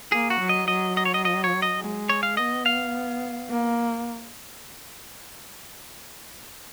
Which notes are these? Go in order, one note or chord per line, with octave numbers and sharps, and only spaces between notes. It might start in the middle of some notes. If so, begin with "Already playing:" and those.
A#3 G#4
F#4
F#3
D#5
F#3 D#5
D#5
C#5
D#5
D#5
C#5
D#5
G#3
C#5
F5
B3 D#5
F5
A#3